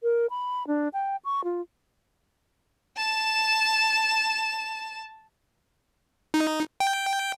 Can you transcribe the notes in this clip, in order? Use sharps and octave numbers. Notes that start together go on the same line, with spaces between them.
A#4
B5
D4
G5
C#6
F4
A5 E7
D#4
G5